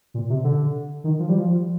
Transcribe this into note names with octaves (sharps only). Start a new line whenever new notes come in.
A#2
C3
D3
D#3
F3
G3
F3